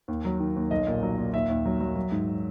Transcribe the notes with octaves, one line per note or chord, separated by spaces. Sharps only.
D#2
F#3
D#3
D#2
B1 D#5
A#2
F#3
A#2
D#2 E5
D#2
F#3
F#3
F#3
G#2